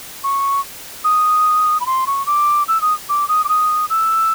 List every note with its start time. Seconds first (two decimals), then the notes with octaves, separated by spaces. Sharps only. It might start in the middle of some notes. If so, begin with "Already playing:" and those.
0.24 C#6
1.04 D#6
1.80 B5
1.86 C6
2.07 C#6
2.27 D6
2.68 E6
2.82 D#6
3.09 D6
3.28 D#6
3.44 D6
3.49 D#6
3.90 E6